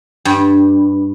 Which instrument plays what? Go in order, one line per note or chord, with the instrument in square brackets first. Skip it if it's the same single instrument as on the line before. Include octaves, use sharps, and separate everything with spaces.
[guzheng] G2